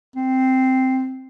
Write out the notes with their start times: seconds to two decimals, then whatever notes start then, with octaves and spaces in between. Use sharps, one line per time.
0.16 C4